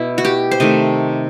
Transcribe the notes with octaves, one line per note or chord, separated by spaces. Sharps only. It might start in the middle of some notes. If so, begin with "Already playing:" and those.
Already playing: B2 B3 E4
F#4
G4
C5
C3 D#3 A3 D#5